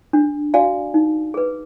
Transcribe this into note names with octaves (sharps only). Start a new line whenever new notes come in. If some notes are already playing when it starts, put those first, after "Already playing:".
D4
F#4 D5 F5 G#5
D#4
G#4 B4